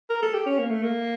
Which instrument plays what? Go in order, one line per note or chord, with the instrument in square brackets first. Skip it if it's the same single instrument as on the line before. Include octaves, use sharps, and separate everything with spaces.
[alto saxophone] A#4
A4
G4
C#4
A#3
A3
A#3